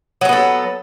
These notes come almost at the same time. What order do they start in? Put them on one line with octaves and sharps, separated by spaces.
F#3 C#4 B3 A4